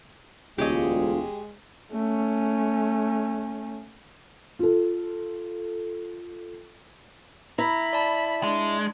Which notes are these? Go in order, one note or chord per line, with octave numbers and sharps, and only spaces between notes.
E1 D2 G#3 F4 G4 C#5 D#5
A3 C#4
F4 A4
E4 A#5 B5 A#6
D5 A5
G#3 D4